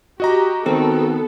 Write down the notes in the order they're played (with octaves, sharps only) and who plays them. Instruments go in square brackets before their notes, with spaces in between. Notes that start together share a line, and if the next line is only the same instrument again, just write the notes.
[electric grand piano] F#4 D#5 A#5 [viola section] G4
[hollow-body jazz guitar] D#3 C4 [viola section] B3 A4